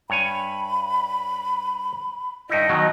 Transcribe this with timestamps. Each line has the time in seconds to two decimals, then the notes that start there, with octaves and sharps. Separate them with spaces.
0.10 G2 C#5 G#5 B5
2.49 G2 D#4 E4 D#5
2.69 B2 D#3 F#3